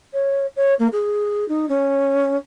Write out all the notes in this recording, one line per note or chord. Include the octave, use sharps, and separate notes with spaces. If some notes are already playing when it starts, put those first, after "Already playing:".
C#5
C#5
A#3
G#4
D#4
C#4